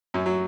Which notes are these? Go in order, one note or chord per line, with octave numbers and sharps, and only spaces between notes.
F#2 F#3
F#3